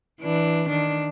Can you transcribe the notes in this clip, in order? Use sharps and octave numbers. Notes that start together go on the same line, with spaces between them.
E3 D4
D#3 D4